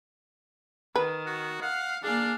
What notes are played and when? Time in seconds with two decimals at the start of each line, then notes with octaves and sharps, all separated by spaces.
0.96 D#3 B4
1.26 F#4
1.62 F5 F#5
2.03 A#3 D4 G#4 D5 F5